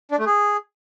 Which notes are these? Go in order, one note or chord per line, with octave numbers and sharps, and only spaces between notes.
D4
A3
G#4